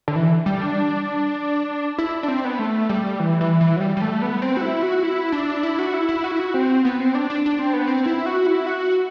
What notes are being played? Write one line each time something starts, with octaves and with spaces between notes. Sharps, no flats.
D3
E3
G3
D4
E4
D4
C4
B3
A3
G3
E3
E3
E3
F#3
G3
G3
A3
B3
C4
F#4
E4
F#4
E4
D4
E4
F#4
E4
E4
F#4
E4
F#4
C4
B3
C4
D4
D4
D4
C4
B3
C4
E4
F#4
E4
F#4